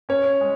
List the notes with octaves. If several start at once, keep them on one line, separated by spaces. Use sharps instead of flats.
C#4 C#5
G#3